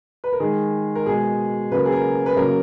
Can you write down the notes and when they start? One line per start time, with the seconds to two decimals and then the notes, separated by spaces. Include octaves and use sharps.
0.24 B4
0.32 A#4
0.40 D#3 G#3 G#4
0.95 A#4
1.06 B2 G#3 G#4
1.72 C#3 F#3 A#3 B4
1.78 A#4
1.86 G#4
1.92 A#4
2.26 B4
2.36 C#3 F#3 A#3 A#4